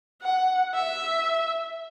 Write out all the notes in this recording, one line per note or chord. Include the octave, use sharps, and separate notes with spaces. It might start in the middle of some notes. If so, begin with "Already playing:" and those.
F#5
E5